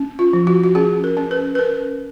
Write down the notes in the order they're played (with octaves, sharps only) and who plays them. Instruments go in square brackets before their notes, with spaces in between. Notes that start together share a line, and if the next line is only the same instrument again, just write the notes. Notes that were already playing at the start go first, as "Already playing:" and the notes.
Already playing: [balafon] C#4
F4
F3
F#4
F#4
C#4 G#4
A#4
C#4
B4
B4
C#4 A#4